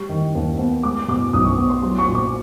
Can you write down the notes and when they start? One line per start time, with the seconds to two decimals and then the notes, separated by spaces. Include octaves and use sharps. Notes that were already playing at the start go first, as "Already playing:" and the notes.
Already playing: G3 C#6
0.09 D#3
0.35 D#2
0.59 B3
0.83 G#3 D6
1.08 B2 D6
1.33 B1 D#6
1.45 C#6
1.58 B3
1.70 C6
1.82 F#3 C6
1.98 C#6
2.08 A#2
2.15 D6